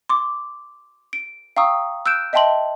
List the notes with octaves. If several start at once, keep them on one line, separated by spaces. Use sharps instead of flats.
C6 D6
D7
F5 G5 A#5 C#6 D#6 E6
E6 F#6 G6 D7 E7
D#5 E5 G5 A5 C6 F#7